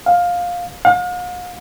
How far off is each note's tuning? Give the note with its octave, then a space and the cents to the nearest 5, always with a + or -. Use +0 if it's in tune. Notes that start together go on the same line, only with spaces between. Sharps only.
F5 +15
F5 +45